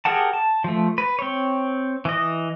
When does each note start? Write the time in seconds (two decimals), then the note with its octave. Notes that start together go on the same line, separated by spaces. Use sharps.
0.05 G4 G#4 A#4 F#5 A5
0.33 A5
0.64 F3 A3
0.98 B4
1.19 C4 C#5
2.05 E3 D#5